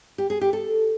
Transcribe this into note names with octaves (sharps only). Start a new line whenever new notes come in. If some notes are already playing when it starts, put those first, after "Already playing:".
G4
G#4
G4
A4